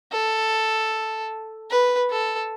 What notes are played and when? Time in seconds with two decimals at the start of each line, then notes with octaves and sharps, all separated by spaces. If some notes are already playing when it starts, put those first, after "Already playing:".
0.12 A4
1.70 B4
2.10 A4